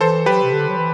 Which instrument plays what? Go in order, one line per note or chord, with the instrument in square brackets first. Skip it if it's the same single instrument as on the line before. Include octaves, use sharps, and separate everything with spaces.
[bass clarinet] E3 [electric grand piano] A4 C5
[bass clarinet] F#3 [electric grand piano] G4 B4
[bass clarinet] C3
D3
F#3
E3